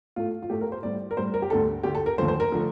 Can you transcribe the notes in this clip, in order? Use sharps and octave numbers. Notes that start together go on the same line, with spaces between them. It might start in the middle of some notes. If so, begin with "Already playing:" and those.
A2 A3 F4
F4
A2 A3 G4
A#4
C5
A2 G3 D5
A#4
A2 G3 C5
A#4
G4
D2 D3 A3 A4
D2 D3 A3 G4
A4
A#4
D#2 D3 F3 A3 C5
C5
A#4
D3 F3 A3